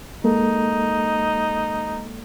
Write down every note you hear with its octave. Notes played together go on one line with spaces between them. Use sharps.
G#3 A#3 D#4 A4